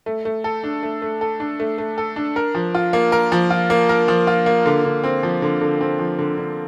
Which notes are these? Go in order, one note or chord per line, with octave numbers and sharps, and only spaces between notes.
A3
A3
A4
D4
A3
A3
A4
D4
A3
A3
A4
D4
A#4
F3
F4
A#3
A#4
F3
F4
A#3
A#4
F3
F4
A#3
D3
D3
C4
F3
D3
D3
C4
F3
D3
D3